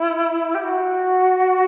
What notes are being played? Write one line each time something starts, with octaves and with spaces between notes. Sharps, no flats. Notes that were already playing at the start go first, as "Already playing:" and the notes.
Already playing: E4
G4
F#4